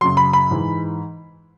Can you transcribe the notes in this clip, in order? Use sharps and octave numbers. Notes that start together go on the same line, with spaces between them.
F#2 C#3 F#3 C6
B5
B5
G#2 E3